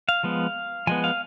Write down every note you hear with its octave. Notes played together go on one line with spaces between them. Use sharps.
F5
F3 G#3 B3
F3 G#3 B3 G#5
F5